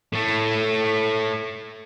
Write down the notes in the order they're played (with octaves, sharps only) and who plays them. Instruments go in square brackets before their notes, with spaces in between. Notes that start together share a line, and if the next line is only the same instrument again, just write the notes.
[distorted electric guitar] A2 A3